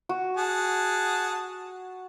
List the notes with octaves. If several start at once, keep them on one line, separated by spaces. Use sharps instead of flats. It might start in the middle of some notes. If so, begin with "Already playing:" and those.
F#4
G#4 F#5 A5